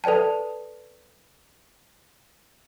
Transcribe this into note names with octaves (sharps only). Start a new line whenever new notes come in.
A4 B4 D5 G5 A5